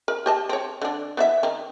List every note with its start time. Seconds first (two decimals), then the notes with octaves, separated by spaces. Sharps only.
0.08 A#4
0.26 G4 D#5 A5
0.49 C4 C#5
0.82 D3 D4
1.17 B3 E4 E5
1.43 D#3